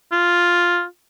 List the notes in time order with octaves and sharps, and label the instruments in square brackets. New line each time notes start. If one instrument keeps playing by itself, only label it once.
[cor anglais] F4